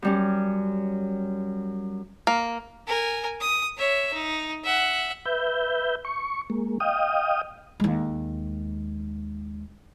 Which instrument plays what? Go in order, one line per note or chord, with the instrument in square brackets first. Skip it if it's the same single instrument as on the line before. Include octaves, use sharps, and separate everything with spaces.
[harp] F#2 G3 C#4
[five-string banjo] A#3
[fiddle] A#4 G#5
D#6
C#5 E5
D#4
E5 F#5
[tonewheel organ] B4 E5 G6
C#6
G#3 A#3
D#5 F5 G5 D#6
[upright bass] D#2 G#3